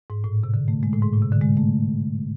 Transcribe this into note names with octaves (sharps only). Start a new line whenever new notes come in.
G#2
A2
C3
D3
A3
G#3
A2
G#2
A2
C3
D3
G#3
A3